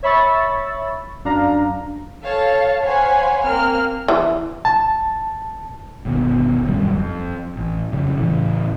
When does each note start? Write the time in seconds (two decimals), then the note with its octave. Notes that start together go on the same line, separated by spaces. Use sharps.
0.03 C#5 E5 B5 C#6 E6 A6
1.24 F#2 D4 F5 A#5
2.22 A4 C#5 F5 A5
2.82 C5 C#5 F5 F#5 G#5 B5
3.43 A#3 C4 F6
4.08 E3
4.65 A5
6.05 G1 D#2 B2
6.65 D#1 F#2 D#3 G3
6.94 F2
7.56 A1
7.92 F2 C#3
8.18 A2 C#3 E3